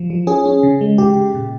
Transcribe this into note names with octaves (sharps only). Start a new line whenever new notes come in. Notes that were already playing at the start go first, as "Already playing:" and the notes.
Already playing: F3
F3
C#4 G#4
C#4
C#3
G#3
C#3 G4
C#3
A#2